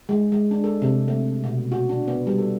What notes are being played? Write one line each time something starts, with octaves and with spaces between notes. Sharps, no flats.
G#3
G#3
D4
A4
C3
A3
B2
F#4
D4
B3
G3
A4